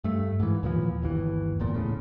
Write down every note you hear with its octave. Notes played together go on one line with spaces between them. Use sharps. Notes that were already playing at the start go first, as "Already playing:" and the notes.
G2 A3
G#2 E3
D#2 A#2 E3 F3
G1 D#2 E3
D1 E2 A#2
A2 C#3